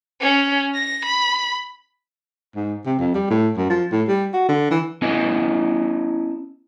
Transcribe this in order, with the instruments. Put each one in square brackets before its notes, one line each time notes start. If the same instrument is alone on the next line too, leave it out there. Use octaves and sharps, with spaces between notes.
[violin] C#4
A#6
B5
[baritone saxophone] G#2
C3
F2
G3
A2
F#2
F3
A2
G3
F#4
D3
E3
[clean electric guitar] B3 C#4 E4 D5 D#5 G#5